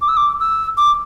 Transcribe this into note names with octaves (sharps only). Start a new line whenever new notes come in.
D6
E6
D6
E6
D6